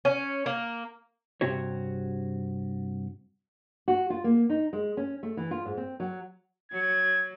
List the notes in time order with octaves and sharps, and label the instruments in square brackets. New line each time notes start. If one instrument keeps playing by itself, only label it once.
[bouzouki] C#4
A#3
[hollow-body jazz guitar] G2 C3 C4 F#4 C#5
[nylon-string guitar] F#4
F4
A#3
D#4
G#3
C#4
A3
E3
F4
G#2
C4
F#3
[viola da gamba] F#3 [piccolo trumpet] G#6